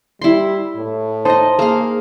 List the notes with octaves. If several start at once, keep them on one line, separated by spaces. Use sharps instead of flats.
G3 E4 C6
A2
D#4 C5 D#5 A5 C6
A#3 G#4 F5